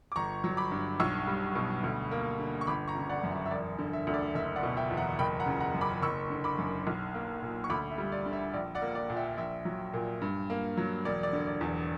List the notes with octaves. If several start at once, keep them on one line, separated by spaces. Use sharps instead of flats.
D6
G1 A#5 C#6
F#3
B5 D6
G2
B1 C#6 E6
G3
B2
D2
A#3
D3
C#6
G1 B5 D6
A#5 C#6
C#3
D5 F#5
F#2
E5
E5
E1 D5
D3
E5
D2
D5
F#1 E5
D5 F#5
B2
E5 G5
E2
F#5 A#5
F#1 G5 B5
F#5 A#5
C#3
F#5 A#5
F#2
B5 D6
F#1 C#6 E6
D3
B5 D6
F#2
B1
A#3
A#2
C#6
D2 B5 D6
E5
G3
D5
D3
E5
A#1 D5
D5 F#5
A#3
D5
A#2
E5 G5
A#1 E5
F#3
A#2
G2
A#3
F#3
E1 D5
D5
D3
D5
E2